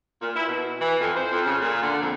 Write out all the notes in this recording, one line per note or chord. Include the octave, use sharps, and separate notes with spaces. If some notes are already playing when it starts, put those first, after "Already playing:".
A#2
E4
B2
E3
F2
C5
F2
C#3
A#2
D3
F2